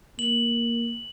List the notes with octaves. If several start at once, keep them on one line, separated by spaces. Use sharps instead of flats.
A#3 F#7